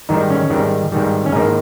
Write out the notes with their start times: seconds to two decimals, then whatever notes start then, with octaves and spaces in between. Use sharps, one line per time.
0.09 G#2 D#3 G3 D#4
0.30 C#4
0.50 G#2 D#3 G3
0.92 G#2 D#3 G3
1.26 C#4
1.32 G#2 D#3 A#3 D#4